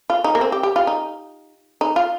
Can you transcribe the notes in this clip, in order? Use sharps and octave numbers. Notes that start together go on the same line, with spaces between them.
F4
D#4
A#3
C4
G4
G4
F4
D#4
D#4
F4